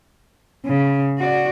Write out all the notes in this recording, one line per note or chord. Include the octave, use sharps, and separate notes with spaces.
C#3
F#4 D5